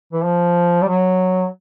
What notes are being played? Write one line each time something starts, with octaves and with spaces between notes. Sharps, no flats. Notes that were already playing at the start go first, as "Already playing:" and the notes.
E3
F3
G3
F#3